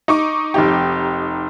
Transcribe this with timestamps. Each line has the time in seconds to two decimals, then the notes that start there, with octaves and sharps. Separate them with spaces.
0.08 D#4 C#6 D6
0.54 F1 D#4 G4